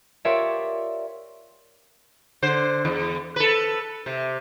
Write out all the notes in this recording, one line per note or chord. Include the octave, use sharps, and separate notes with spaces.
F4 G4 A#4 C#5 D5 E5
D3 C5
E2
A4 B4
C3